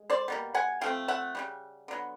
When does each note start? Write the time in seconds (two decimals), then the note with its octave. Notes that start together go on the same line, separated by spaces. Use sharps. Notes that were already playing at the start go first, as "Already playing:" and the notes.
Already playing: G#3
0.10 C5 D5
0.28 B2 G3 A#3
0.54 F#5 G#5
0.81 F3 A3 C4 F5 G5
1.08 E5 F#5
1.35 C#3 E3 G3
1.88 D3 F#3 B3